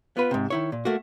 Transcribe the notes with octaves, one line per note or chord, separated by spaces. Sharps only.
B3 F4 B4
G#2 C3
D#3 E4 C#5
A#2
A3 A#3 F#4